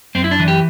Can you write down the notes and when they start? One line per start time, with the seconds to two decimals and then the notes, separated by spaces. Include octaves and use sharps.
0.15 F#2 C4
0.24 E4
0.31 D4
0.40 E3
0.48 G4